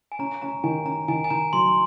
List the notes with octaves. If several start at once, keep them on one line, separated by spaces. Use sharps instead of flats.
G#5
C#4 A#5
C#4 A#5
D#3 G#5
C#4 A#5
D#3 G#5
G#5
D#3 A#5
F#3 C6